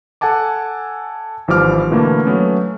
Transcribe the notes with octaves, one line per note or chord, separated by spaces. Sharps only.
A4 F#5 G#5 A5 D6
G#1 E3 F3 G3 D6 F6
B2 D3 E3 A3 A#3
F#3 A3 B3 C#4